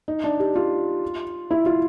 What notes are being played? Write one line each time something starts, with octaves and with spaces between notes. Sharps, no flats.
D#4
D4
G4
F4
E4
F4